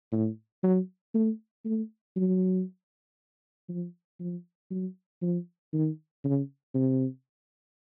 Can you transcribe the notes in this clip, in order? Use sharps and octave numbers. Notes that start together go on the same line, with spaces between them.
A2
F#3
A3
A3
F#3
F3
F3
F#3
F3
D#3
C#3
C3